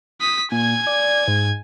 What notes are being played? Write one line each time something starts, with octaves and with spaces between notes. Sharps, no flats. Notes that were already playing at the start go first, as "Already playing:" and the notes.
D#6 B6
A#2 G#5 G#6
D5
G#2